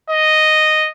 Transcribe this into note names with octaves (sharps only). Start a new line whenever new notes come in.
D#5